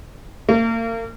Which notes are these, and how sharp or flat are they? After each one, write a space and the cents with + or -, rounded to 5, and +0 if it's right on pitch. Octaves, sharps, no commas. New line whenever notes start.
A#3 -40